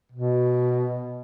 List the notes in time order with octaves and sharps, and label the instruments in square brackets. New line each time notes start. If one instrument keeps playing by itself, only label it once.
[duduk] B2